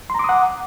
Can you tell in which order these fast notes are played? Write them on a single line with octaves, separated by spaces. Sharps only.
C6 A#5 D6 D#6 F#5